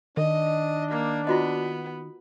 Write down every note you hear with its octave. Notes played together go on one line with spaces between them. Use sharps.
D#3 D4 D#5
A#3
B3 F4 F#4 D#5